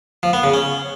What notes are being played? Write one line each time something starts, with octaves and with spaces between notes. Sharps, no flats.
F3
B3
C#3
C#4